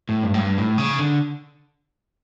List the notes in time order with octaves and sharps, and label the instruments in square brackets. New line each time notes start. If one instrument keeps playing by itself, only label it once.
[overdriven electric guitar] A2
G2
A2
G2
A2
C#3
D3